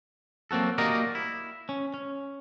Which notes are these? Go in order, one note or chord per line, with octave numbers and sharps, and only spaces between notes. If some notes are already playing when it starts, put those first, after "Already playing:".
F#3 A#3 C4 F#4 A4
A#3 F#4 G4 A#4 D5 D#5
E4
C#4
C#4